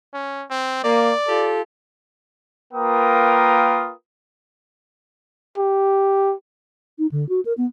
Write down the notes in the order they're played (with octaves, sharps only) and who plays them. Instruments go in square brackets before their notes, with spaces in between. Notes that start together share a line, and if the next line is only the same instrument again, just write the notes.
[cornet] C#4
C4
[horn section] A#3 [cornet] D5
[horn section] F4 G4 A4
[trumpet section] A#3 F4 A#4 B4 G5 D#6
[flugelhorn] G4
[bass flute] D#4
D3
F#4
A#4
B3